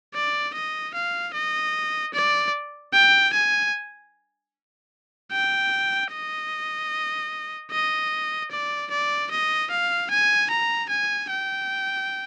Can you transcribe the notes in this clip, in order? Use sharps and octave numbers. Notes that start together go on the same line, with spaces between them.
D5
D#5
F5
D#5
D5
G5
G#5
G5
D#5
D#5
D5
D5
D#5
F5
G#5
A#5
G#5
G5